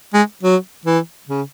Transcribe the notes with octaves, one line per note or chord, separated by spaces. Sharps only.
G#3
F#3
E3
C#3